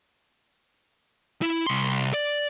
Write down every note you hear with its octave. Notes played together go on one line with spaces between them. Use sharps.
E4
C2 C6
D5